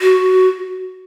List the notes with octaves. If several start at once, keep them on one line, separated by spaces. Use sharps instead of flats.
F#4